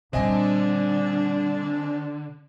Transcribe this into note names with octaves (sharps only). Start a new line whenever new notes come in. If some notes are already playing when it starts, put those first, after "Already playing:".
A#2 D3 G3 C4 D4 D#5 G#5